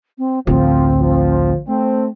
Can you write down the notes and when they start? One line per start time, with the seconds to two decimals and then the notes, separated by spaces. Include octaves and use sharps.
0.18 C4
0.47 A1 D2 F3 C4
0.99 F3
1.67 A3 C4